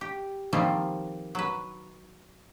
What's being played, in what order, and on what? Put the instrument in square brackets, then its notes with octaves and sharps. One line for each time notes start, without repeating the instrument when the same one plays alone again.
[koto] G4
D#3 F3 G3 A#3 C4 F4
F#3 B4